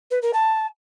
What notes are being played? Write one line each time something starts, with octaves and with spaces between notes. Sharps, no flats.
B4
A#4
A5